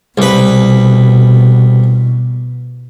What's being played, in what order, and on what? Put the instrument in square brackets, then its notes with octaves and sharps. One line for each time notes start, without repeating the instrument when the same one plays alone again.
[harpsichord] C2 B4 [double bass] B2